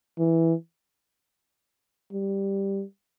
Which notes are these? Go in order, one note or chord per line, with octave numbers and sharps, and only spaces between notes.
E3
G3